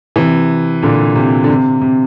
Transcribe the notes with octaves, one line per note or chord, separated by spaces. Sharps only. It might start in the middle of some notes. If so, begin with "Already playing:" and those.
C3 E3
A#2 D3
C3
D3
C3
C3